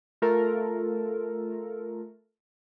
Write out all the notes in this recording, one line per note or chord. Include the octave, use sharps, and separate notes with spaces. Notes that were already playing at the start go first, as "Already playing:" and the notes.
A3 F4 A4 A#4